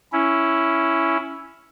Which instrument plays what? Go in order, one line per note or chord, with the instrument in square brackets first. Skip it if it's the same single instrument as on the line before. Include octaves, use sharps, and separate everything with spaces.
[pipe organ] C#4 E4